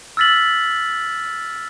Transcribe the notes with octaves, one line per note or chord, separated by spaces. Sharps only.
E6 F6 A6 B6 F#7